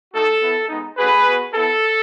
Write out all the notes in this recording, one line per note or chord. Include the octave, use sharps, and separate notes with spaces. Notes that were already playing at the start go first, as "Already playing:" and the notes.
A3 D#4 F#4 A4
B3 E4
G#3 B3 D#4
A3 C#4 F#4 G#4 B4
B3 F#4
B3 E4 A4